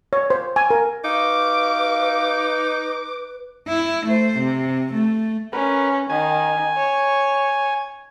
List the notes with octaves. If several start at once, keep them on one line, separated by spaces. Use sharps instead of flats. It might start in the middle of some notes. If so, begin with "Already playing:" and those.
C#5
C5
G#5
A#4
D#4 F#4 G4 B4 F5 D6
E4
A3 C5
C3
A3
C#4 A#4 B4
D#3 G#5
C#5